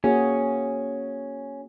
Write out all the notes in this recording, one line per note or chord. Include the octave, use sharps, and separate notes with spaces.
A#3 C#4 F#4 G#4